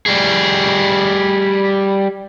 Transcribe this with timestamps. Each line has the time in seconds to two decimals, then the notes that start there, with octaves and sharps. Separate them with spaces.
0.06 G3 G#4